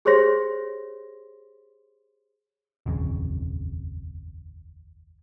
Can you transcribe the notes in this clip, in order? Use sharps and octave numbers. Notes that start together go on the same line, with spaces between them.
G4 G#4 C5 C#5 C6 A#6
D#1 G#1 F2 C#3